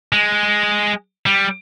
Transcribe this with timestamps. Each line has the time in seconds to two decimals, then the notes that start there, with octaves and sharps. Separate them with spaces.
0.13 G#3
1.26 G3